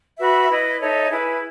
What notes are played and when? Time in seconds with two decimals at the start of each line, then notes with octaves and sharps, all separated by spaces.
0.19 F#4 B4 E5 B5
0.50 E4 B4 D#5
0.80 D#4 A4 C#5 E5
1.11 E4 G#4 B4